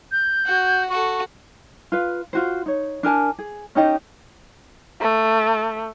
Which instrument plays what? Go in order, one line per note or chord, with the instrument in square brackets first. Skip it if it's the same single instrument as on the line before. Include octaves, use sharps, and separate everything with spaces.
[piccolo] G6
[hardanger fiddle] F#4
[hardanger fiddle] F#4 A4 [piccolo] C#6
[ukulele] F4 B4 F5
F4 F#4 C5
D#4 C#5
D4 A#4 G#5 A5
G#4
C#4 D#4 G4 D#5
[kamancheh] A3